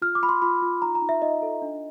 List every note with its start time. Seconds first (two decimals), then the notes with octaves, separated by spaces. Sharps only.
0.02 F4 F6
0.15 D6
0.22 F4 B5
0.29 C6
0.42 F4 B5
0.62 F4
0.82 D#4 A#5
0.95 A#5
1.02 D#4
1.09 E5
1.22 D#4 D#5
1.42 A4
1.62 D4